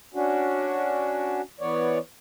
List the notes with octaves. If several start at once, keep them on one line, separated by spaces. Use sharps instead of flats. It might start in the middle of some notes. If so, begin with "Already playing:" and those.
C#4 D4 F#4
E3 B3 C#5 D5